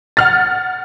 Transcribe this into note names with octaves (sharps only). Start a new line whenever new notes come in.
F#5 F6 A6